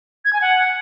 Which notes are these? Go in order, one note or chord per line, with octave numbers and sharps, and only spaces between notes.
G#6
G#5
F#5